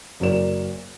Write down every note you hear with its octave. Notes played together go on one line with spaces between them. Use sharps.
F#1 F#3 A#4 D5 E7